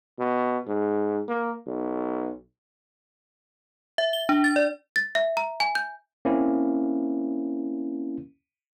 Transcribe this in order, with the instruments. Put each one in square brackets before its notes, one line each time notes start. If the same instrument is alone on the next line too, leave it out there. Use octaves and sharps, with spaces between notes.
[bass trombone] B2
G#2
A#3
B1
[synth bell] E5
G7
D4
A6
D5
[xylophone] A6
E5
A#5
G#5
G6
[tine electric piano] A#3 C4 C#4 E4